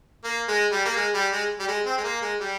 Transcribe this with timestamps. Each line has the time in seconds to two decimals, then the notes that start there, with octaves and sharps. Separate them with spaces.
0.24 A#3
0.48 G#3
0.72 G3
0.85 A#3
0.96 G#3
1.14 G3
1.32 G#3
1.59 G3
1.68 G#3
1.85 C4
1.98 G#3
2.04 A#3
2.21 G#3
2.40 G3